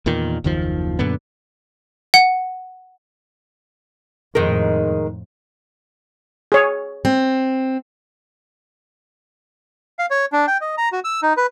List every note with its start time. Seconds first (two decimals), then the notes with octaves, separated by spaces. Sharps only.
0.06 E2 A#2 D#3
0.44 F#1 D#2 D#3 F3
0.99 F#2 A#2 D3 B3
2.14 F#5
4.35 F2 A2 D#3 G#3 A#4
6.52 G#4 C#5
7.05 C4
9.99 F5
10.11 C#5
10.32 D4
10.48 G5
10.61 D#5
10.78 A#5
10.92 F#4
11.04 E6
11.22 D#4
11.37 B4